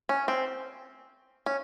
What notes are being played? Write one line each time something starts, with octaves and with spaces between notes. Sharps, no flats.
C#4
C4
C#4